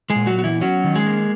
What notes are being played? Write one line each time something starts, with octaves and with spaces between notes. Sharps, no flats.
G#3 G#4
A#2
F#3 F#4
B3 F#4
E3 E4
F#3 C#4 F#4
D#3
G#3 G#4
A#3